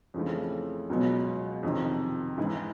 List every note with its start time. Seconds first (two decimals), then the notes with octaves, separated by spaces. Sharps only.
0.14 F2 C#3 E3 A3
0.90 C#2 B2 F#3 B3
1.63 F2 C3 D#3
2.38 G#2 E3 G#3